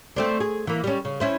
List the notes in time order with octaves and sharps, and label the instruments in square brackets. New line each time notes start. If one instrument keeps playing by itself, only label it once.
[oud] A3 C4 D4
G#4
E3 A#3
G3 C#4
C#3
C#4 E4 C5